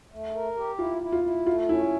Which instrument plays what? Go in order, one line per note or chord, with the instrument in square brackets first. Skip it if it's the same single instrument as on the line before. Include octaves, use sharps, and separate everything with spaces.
[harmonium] A3
A#4
G4
[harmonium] E4 [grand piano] F4
[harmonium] E4
[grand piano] F4
[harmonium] E4
[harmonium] A3 [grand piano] F4
[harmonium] C#4 [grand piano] E4